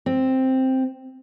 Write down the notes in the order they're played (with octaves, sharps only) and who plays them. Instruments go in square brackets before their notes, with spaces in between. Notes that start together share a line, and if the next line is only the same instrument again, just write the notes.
[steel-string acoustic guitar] C4